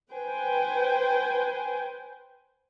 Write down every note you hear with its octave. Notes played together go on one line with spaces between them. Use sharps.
B4 C5 G5 G#5